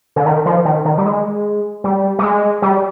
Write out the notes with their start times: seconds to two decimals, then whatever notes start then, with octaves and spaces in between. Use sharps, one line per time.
0.16 D3
0.26 D#3
0.46 F3
0.65 D#3
0.85 D#3
0.98 G3
1.05 G#3
1.84 G3
2.19 G3
2.23 G#3
2.62 G3